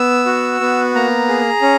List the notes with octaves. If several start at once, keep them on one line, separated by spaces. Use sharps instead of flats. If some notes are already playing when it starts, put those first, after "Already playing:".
Already playing: B3 E6
F#4
B3
A#3 A#5
G#4
C#4